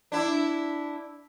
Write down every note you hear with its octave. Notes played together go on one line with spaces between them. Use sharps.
D4 E4